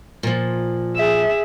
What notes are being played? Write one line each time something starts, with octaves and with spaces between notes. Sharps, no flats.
A#2 F3
G#4 E5